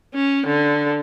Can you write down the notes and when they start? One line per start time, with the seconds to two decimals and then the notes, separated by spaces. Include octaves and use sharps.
0.15 C#4
0.47 D3